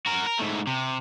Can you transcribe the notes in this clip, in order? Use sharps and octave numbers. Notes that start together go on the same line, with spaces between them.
F#4 A#4
A#4
G#2 A3
C3